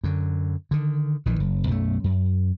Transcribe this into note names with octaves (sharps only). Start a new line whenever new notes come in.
F#2 D3
D3 D#3
A#1 D#3 E3
F#1
B1 F#2 F#3 A3
F#2